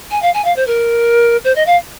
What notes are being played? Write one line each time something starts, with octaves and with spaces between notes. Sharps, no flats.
G#5
F5
G#5
F5
C5
A#4
C5
D#5
F5